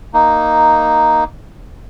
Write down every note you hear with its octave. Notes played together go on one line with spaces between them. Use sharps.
A#3 D#4